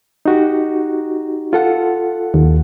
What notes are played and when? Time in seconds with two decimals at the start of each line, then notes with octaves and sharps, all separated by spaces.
0.25 D#4 F#4 G4
1.53 F4 A4 F#5
2.34 D#2